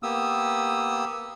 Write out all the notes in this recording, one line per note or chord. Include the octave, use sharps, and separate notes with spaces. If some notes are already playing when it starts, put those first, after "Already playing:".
A#3 B3 G4 D#6 E6